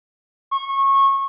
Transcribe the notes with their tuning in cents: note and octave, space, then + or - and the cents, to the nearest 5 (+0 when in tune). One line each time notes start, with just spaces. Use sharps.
C#6 -25